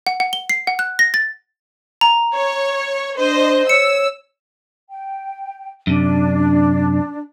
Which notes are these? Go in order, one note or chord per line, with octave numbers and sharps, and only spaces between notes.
F#5
F#5
G7
C7
F#5
F#6
A#6
A6
A#5
C#5
D4 C5 D#5
C#5 E6 C#7
G5
F#2 C3 D4